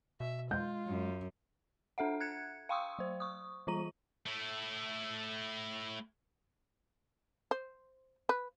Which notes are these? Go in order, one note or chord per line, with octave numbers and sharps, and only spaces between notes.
B2 E5
G#3 F4 G6
F#2
D4 A4 E5 F#5
F#6 G#6 C#7
F5 G5 C6 C#6 D#6 E6
F#3 C5
C#6 D#6
E3 G3 F4 A#5 D#7
A3 E4
C5
B4